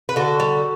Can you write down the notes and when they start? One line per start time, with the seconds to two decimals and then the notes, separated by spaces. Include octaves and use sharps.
0.09 B4
0.16 D3 F#4 A4
0.40 G3